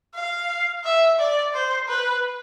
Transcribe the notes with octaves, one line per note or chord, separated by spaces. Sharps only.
F5
E5
D5
C5
B4